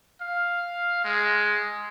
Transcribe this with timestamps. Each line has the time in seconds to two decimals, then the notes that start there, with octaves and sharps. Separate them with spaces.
0.21 F5
1.04 G#3